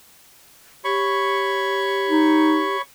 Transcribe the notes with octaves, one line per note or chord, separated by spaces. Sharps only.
G4 C#5 B5 C#6
D#4